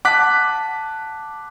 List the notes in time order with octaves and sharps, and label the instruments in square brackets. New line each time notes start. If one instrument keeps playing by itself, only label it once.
[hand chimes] F#5 A5 [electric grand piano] D6 F#6 B6